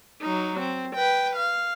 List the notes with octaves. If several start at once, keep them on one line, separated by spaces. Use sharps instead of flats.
F#3 D#4
C4
B4 G5
F5